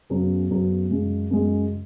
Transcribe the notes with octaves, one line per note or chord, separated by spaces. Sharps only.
F#2 C#3 F#3 B3
F#2 C#3 F#3 B3
F#2 C#3 G#3
F#2 C#3 G#3